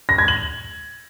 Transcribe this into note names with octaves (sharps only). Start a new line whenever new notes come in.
A#6
G#6
F#7